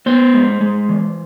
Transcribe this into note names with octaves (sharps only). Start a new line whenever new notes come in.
B3 C5
G#3
G#3
E3